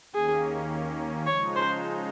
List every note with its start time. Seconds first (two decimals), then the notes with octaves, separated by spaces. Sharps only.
0.14 D#2 D#3 A#3 C#4 G#4
1.27 C#3 F3 G#3 D#4 C#5
1.56 C5